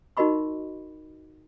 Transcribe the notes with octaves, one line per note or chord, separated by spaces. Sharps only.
D#4 F#4 A#4 D#5 B5 C#6